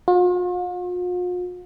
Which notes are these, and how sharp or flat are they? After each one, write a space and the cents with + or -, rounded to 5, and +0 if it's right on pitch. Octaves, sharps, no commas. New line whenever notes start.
F4 +45